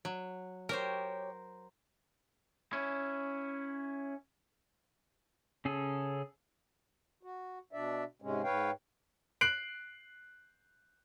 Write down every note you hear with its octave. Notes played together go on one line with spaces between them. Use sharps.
F#3
G4 A#4 C5 C#5 G5
C#4 E4
C#3 C#4 G#4 A4
F#4
B2 D4 D5 E5
G#2 C3 G#3 C#4
G#2 B4 C#5 F5 G5
F#6 C7 D7 F#7